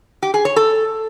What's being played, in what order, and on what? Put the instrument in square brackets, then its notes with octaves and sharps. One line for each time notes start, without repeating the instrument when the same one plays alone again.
[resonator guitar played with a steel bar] G4
G#4
C#5
A4